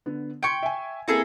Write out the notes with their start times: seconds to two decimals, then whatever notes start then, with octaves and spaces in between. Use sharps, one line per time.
0.06 D3 B3
0.43 G5 C6 C#6 G#6 D7
0.63 E5 G#5
1.08 A#3 C4 E4 G#4 A4 A#5